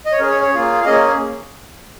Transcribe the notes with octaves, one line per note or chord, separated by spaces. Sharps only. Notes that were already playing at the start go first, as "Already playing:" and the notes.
D#5
C#5
C#4 G#4 A#4
C#5
C#5
A#3 F4 G#4
F5
A#3 C#4 G#4 D#5